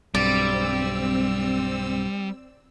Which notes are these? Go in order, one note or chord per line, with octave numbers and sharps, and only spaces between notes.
B1 G2 G3 C4 D5 E6